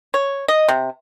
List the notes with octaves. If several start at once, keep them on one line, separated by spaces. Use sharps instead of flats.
C#5
D#5
C3